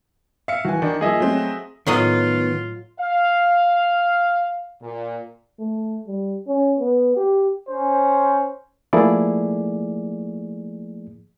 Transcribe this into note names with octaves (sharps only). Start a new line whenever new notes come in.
E5 F5 C#7
D#2 E3 F#4 G#5
D#3 D4
F3 A#3 G#4 D#5 E5
F#3 A3 C4
A2 D#3 F#3 B3 F4 D#5
F5
A#2
A3
G3
C#4
B3
G4
C#4 C5
F3 A3 A#3 E4 G#4 D5